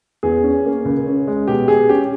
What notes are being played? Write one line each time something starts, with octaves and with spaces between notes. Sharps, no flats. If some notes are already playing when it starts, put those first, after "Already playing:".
E2 G#4
C#4
A#3
C#2
C#4
G#3
B2 G4
B2 G#4
C#4 G4